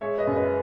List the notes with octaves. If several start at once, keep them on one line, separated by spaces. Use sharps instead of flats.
G#3 C#5 E5
B4 D#5
F#2
B4 D#5